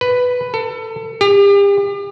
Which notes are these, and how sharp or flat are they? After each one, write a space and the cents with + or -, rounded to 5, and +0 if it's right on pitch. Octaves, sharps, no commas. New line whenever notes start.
B4 +5
A4 +30
G4 +35